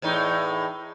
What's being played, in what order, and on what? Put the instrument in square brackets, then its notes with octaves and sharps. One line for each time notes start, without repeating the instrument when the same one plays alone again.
[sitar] E2 A2 D#4